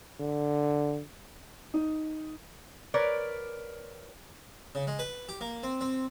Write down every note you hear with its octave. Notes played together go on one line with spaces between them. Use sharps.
D3
D#4
A#4 B4 C#5 D5
C#3
G#3
B4
G4
A#3
C4
C4